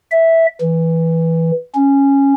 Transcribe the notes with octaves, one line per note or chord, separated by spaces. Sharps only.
E5
E3
C#4